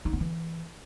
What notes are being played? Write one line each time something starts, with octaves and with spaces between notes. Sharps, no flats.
D#4
B3
E3